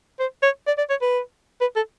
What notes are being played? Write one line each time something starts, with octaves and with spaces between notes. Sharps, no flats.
C5
C#5
D5
D5
C#5
B4
B4
A4